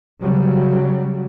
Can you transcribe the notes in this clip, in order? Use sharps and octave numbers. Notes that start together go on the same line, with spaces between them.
C#3 F#3 G3